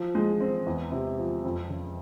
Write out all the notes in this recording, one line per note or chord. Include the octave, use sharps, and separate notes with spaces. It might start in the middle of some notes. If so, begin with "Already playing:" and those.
Already playing: F3
G#3
C4
E2
C3
F3
F2
C#3